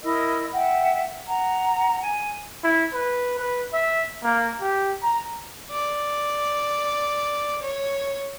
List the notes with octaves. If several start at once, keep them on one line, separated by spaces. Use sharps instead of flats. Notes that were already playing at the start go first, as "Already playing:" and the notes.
E4 A#4 D#5 E6
E5 F#5 G5
F#5 A#5
G#5
E4
B4
B4
E5
A#3
G4
A#5
D5
C#5